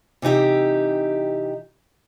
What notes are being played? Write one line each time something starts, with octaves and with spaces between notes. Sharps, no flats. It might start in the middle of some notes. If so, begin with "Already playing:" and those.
C3 E3 D#4 G4 E5